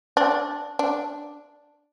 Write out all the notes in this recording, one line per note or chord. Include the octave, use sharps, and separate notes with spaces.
D4
D4